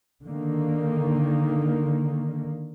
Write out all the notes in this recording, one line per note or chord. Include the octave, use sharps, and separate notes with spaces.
D3 D#3 A#3